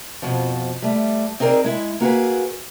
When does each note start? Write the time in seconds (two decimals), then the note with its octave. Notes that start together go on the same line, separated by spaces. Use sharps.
0.22 F2 B2 F3
0.82 G3 A3
1.40 C4 D#4 G#4 A#4 D5
1.64 G#3 E4
2.00 A#3 F#4 G#4 B4